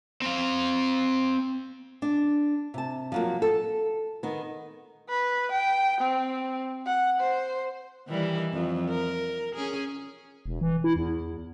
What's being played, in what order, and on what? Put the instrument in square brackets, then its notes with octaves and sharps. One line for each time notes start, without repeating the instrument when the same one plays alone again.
[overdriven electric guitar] C4 F5
[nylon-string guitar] D4
C3 A5
F3 F#3 A#3
A4
D#3 B3
[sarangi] B4
G5
C4
F#5
C5
[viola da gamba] D#3 E3 G3
F2
A#4
C#4 G#4
[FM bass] E1
E3
E4
E2